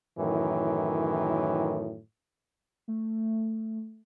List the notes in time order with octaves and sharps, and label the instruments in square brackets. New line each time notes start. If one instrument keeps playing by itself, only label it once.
[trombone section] F#2 A2 D#3 E3
[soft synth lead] A3